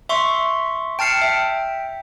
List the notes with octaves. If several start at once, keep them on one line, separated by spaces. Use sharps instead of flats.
E5 C6 C#6
G5 A5 F6 C7 C#7
E5 G5